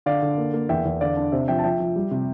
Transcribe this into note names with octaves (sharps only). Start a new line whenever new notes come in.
D3 D5 F5
D3
A#3
A#3
E2 E5 G5
E2
D3 D5 F5
D4
C3 C5 E5
F3 E5 G5
A5
F3 E5 G5
F3
G3
C3